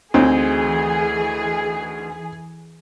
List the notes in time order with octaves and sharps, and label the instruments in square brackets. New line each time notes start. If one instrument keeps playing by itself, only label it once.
[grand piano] D2 D#4 [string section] E3 G#4 [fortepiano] C4